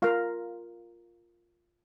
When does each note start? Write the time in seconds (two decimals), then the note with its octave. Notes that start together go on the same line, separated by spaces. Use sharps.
0.02 F4 A#4 F5